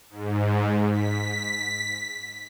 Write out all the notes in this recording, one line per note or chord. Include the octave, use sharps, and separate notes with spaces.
G#2
B6